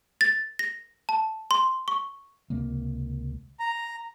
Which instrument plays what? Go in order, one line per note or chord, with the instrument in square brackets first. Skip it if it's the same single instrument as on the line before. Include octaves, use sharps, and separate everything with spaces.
[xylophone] A6
A#6
A5
C6
C#6
[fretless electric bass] C#2 C3 G#3 A#3
[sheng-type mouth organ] A#5